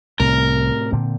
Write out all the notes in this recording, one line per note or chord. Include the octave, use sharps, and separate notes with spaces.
C2 A2 C3 A#4
A#2 D3 C4